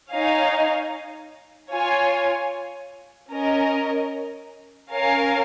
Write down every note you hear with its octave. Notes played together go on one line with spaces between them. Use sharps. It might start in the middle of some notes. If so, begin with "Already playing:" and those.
D#4 C#5 F5 G#5
F4 C#5 G#5
C#4 A#4 D#5
C#4 A#4 C#5 F5 G#5